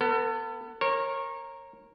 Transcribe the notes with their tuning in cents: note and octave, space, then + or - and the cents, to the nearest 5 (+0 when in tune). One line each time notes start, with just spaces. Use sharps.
B3 +0 A4 +35
A#4 +0 C#5 -30